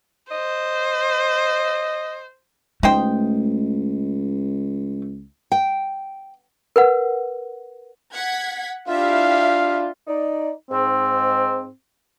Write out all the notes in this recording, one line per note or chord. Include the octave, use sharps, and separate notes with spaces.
C5 D#5
C#2 A3 D#4 C5 G5
G5
A#4 B4 F#5
F#5 G#6 B6
D4 E4 F4 G4 E5 F5
D#4 D5
G#2 C4